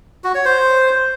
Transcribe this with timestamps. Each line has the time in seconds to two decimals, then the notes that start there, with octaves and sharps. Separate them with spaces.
0.24 F#4
0.35 C#5
0.45 C5